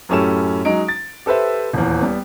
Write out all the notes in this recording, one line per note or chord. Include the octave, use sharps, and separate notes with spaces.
F#2 A2 C#4 G4 A4 E7
F#3 G#3 D#4 D7
A6
G4 A4 B4 C5 E5
D#1 E2
G3 B3